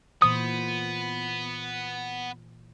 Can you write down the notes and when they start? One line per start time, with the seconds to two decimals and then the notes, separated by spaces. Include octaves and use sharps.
0.22 A#2 E3 B3 C5 D#6